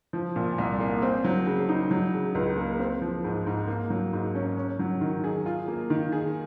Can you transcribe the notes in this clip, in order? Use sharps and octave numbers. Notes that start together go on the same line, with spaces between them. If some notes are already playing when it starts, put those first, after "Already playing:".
F3
A#2
C2
A#3
C4
F#3
C#3
D#4
F#3
C#3
C#2
A#3
C4
F3
G#2
G#2
A#3
F#3
G#2
C#4
C#4
F#3
D#3
G#4
F4
A#3
D#3
G#4